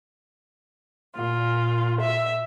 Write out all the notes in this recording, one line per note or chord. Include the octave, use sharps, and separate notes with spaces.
A#2 F4
E5